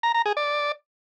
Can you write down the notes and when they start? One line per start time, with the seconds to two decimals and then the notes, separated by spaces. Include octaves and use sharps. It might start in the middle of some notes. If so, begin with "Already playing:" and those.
0.03 A#5
0.14 A#5
0.26 G#4
0.37 D5